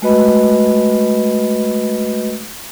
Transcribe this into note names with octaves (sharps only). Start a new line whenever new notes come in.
G#3 A3 F#4 B4 D#5 B5